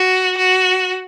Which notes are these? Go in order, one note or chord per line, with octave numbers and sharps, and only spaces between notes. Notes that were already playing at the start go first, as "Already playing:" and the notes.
Already playing: F#4
F#4